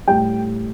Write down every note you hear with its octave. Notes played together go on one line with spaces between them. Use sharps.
A2 G3 G5